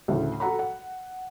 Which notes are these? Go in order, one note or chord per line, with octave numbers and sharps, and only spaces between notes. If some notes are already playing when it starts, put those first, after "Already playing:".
D2 A2 C#3
F#4 A4 F#5 A#5 B5
F#5